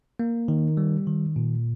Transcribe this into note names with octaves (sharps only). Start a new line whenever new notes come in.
A#3
D#3
G3
D#3
A#2